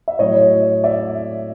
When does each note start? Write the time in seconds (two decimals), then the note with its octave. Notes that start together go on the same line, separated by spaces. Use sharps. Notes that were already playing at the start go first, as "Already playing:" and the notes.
0.08 E5
0.19 A2 F#3 C#5 D#5
0.84 D5 E5